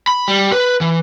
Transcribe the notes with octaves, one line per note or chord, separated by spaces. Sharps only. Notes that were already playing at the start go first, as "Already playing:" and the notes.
B5
G3
B4
E3